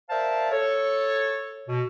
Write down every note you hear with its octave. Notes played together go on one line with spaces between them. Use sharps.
A#4 C5 D5 E5 F5 A5
A4 C#5
B2